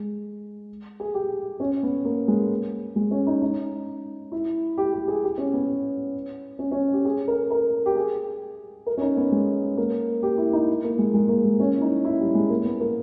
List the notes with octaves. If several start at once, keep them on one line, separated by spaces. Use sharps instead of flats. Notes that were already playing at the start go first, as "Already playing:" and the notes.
Already playing: G#3
G#4
G4
C#4
B3
A#3
G#3
G#3
C#4
D#4
D#4
E4
G4
G4
G#4
G4
C#4
B3
C#4
C#4
G4
G#4
A#4
A#4
G4
G#4
A#4
C#4
D#4
B3
G#3
A#3
G4
E4
D#4
A#3
G#3
G#3
A#3
G#3
C#4
E4
D#4
E4
G3
G#3
A#3
B3
A#3